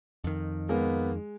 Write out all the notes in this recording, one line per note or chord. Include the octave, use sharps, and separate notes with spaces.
F2 D#3
G#3 A#3 B3